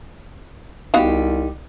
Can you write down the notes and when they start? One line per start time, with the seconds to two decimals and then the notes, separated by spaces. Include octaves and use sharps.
0.94 C2 B3 D#4 F#4 G4 F5